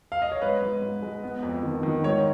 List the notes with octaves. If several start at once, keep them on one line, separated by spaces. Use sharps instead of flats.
F5
D#5
C#5
G#2 B4
G#2
G#2
G#3
B3
F2
D#3
D#3
G#2 C#5